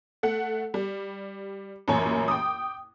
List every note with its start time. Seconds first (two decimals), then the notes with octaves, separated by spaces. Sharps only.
0.23 A3 F#5
0.74 G3
1.88 A1 F#2 A#2 C#5 G#5
2.28 G5 D6 D#6